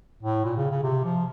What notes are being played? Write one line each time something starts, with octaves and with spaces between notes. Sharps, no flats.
A2
A#2
C#3
C#3
C3
F3